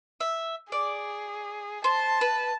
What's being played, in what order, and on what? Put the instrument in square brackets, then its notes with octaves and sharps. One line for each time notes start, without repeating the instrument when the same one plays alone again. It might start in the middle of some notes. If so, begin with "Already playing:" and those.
[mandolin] E5
[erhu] G#4 [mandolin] D5
[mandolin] C5 [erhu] A5
[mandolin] B4